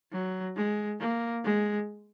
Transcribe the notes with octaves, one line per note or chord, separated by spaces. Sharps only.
F#3
G#3
A#3
G#3